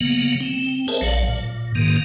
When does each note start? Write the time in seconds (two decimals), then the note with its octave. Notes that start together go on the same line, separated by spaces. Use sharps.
0.01 C#3 F#3 A#3 B3
0.40 C4
0.88 G#4 A#4 C5 C#5 E5 A5
1.01 A#1 F#3 D5 F5
1.28 A#2
1.75 G#2 D#3 A#3